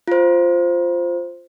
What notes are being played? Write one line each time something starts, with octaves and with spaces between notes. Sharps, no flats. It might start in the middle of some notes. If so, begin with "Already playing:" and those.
F4 C5